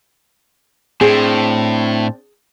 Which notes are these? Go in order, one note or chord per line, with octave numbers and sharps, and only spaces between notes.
A2 C4 D4 G#4 C5